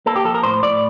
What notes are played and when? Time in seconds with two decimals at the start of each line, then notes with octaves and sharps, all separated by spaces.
0.06 A#3 A4
0.16 G4
0.25 F3 A4
0.35 A#4
0.43 A2 C5
0.63 A2 D5